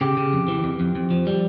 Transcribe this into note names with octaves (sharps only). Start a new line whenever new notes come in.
C#3 G4
C#3
F2
E3
F2
F2
F2
F3
G3